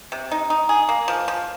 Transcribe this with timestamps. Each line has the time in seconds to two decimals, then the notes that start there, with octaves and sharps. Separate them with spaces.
0.12 C3
0.31 D#4
0.50 D#4
0.69 G#4
0.89 A#3
1.08 F3
1.28 F3